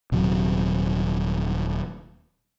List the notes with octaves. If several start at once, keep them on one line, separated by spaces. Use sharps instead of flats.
D#1 C3 F#3